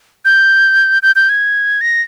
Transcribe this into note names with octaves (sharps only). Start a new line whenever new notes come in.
G6
G6
G6
G#6
A#6